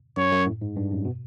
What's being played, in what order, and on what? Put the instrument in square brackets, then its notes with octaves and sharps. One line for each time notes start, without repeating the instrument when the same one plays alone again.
[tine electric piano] F#2 [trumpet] C#5
[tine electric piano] F#2
A2
G#2
G2
F#2
B2